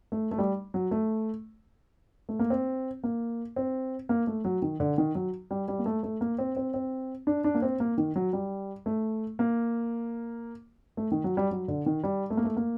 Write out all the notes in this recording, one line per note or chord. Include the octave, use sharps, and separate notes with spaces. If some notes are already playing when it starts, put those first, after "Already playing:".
A3
A3
G3
F#3
A3
A3
A#3
C4
A#3
C4
A#3
A3
F#3
D#3
D3
D#3
F#3
G3
G3
A#3
A3
A3
A#3
C4
C4
C4
D4
D4
A#3
C4
A#3
D#3
F#3
G3
A3
A#3
A3
D#3
F#3
G3
F#3
D3
D#3
G3
A3
A#3
A3
A#3